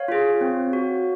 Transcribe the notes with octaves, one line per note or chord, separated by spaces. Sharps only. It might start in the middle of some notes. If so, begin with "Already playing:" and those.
Already playing: C#5 F5
F4 G#4
C4
F#4